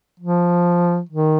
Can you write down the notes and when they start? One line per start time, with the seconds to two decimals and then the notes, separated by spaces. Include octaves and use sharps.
0.20 F3
1.09 D#3